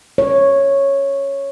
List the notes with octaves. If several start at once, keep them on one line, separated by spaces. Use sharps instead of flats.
C#5